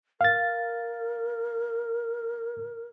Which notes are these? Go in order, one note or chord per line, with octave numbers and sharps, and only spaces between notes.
A#4 F5 A6